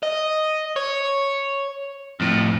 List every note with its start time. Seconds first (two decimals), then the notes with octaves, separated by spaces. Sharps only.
0.03 D#5
0.76 C#5
2.20 F2 A2